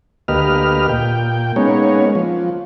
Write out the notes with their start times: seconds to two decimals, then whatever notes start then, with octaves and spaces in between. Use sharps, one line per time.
0.28 D2 A#3 G4 B4 D#5 F6
0.89 A#2 G5
1.56 G#3 A#3 B3 C#4 D#4 C#5
2.15 F3